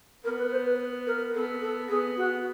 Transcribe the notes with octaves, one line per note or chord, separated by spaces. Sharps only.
B3 A#4
B4
C5
B4
A#4
B3 A4
A4
B3 G#4
F#4